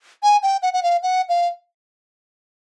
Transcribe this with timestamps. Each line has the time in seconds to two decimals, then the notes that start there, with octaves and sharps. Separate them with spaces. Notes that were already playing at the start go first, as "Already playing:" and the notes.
0.23 G#5
0.43 G5
0.62 F#5
0.73 F#5
0.83 F5
1.03 F#5
1.29 F5